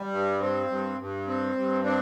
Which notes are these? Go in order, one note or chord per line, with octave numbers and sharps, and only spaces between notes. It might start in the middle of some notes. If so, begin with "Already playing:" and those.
Already playing: G3
G2
C4
G2
G2
C4
G2
C4 D4